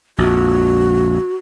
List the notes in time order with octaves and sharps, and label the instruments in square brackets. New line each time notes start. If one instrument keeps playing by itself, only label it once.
[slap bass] A#1 F2 [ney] F#4